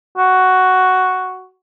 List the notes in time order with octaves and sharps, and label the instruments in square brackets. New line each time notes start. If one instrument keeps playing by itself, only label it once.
[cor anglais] F#4